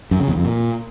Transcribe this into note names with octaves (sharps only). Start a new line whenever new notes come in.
F#2
C#3
E2
F2
A#2